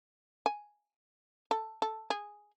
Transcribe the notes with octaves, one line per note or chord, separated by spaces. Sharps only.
G#5
A4
A4
G#4